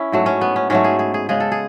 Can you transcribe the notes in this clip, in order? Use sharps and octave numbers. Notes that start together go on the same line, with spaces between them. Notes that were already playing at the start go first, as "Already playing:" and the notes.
Already playing: C#4 E4
G#2 F#3 A3
C#4
B3
C#4
G#2 F#3 A3 C#4
G#4
G#4
G#4
C#3 G#3 G#4
A4
G#4